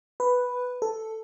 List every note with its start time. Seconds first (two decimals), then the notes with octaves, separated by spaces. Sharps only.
0.20 B4
0.82 A4